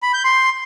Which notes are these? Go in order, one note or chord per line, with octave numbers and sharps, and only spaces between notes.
B5
G6
C6